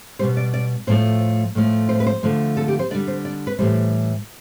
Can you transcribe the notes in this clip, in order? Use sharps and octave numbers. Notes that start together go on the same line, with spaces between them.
B2 G3 C5
D5
D5
A2 F3 A3 C5
A2 F3 A3
C5
B4
C5
D3 F3 A3
A4
G4
C5
D3 G3 D5
C5
D5
B4
A2 E3 G3 C5